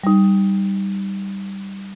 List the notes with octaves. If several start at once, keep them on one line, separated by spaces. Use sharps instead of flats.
G3 D#4